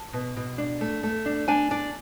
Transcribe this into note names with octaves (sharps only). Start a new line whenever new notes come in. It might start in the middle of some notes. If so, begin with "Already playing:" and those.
Already playing: A5
B2
B2
D4
A3
A3
D4
D4 G#5
D4